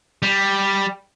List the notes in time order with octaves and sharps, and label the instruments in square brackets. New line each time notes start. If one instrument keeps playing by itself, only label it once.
[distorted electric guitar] G3